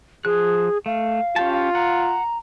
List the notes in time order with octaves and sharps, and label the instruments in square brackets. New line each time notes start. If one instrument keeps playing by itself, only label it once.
[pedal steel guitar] F3 F#6 [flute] G#4
[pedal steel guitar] A3 [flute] F5
[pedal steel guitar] C#4 G4 A5 [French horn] F4
[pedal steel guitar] F#5 [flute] A#5